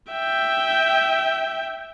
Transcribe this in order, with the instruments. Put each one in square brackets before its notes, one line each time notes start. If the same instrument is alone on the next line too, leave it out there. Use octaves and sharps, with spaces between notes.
[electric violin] E5 G5